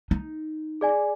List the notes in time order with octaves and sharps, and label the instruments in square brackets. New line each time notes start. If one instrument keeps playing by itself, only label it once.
[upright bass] D#4
[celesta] G#4 D5 G#5